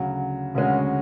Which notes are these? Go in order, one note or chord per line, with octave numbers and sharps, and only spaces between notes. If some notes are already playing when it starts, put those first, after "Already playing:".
Already playing: D2 C#3 F#3
D2 C#3 G#3 C#4 F#4